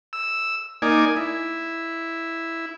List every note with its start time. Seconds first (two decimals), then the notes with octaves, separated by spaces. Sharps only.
0.13 E6
0.82 A#3 D#4 D5 G#5
1.17 E4